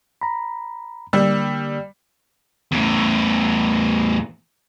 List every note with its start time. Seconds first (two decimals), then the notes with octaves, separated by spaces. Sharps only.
0.22 A#5 B5
1.13 D3 G3 A#3 E6
2.72 E2 A2